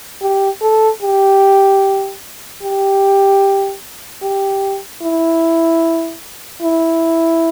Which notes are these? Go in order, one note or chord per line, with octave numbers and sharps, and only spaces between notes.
G4
A4
G4
G4
G4
E4
E4